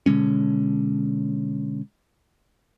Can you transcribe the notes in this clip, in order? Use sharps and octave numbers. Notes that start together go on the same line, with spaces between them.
B2 D3 G#3 C#4